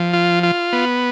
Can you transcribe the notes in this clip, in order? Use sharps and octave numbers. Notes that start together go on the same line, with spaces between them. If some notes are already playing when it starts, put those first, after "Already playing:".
Already playing: F3
F4
F4
B3